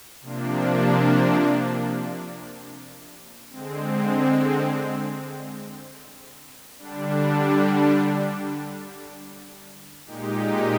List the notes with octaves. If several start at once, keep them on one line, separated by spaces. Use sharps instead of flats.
C3 F3 A#3 D4
D3 G#3 C4
D3 G3 D4
A#2 G#3 D#4 G4